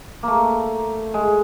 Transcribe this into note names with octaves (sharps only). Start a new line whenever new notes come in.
A3 A#3
G#3